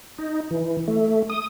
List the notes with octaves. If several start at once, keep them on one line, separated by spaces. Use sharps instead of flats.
D#4
E3
A3
D#6